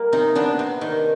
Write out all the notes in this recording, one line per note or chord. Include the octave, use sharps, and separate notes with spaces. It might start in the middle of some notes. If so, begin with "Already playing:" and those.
Already playing: G3 A#3
C3 D#4
B3 D4
C3
D#3